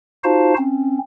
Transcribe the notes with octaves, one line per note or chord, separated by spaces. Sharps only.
D#4 F4 F#4 C5 F5 A5
C4 C#4